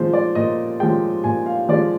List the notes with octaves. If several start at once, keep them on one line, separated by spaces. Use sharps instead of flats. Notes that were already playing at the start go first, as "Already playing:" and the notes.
Already playing: A#2 F3 G#3 C5
D5
A#2 D#5
F3 G#3 G5
A#2 G#5
F5
F3 G#3 D5